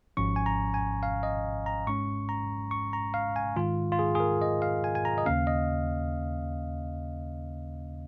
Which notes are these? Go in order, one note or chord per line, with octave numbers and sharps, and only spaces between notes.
G#1 G#2 F3 C#4 C#6
G#5
A#5
G#5
F5
D#5
A#5
G#2 G#3 C#4 C#6
A#5
C#6
A#5
F5
G#5
G#2 D#3 G#3 F4
F4
G#4
G#4
A#4
D#5
F5
G#5
G#5
A#5
D#5
D#2 C#3 A#3 C#4 F5
D#5